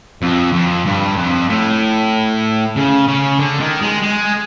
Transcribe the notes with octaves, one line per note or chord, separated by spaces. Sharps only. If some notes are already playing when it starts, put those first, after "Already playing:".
F2
F2
G2
F2
A2
C#3
C#3
D3
D#3
G#3
G#3